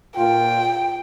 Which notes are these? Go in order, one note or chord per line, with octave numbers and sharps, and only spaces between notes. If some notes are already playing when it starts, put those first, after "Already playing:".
A#2 F4 G5